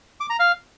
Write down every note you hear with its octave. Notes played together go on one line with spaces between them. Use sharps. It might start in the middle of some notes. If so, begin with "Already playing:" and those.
D6
A#5
F5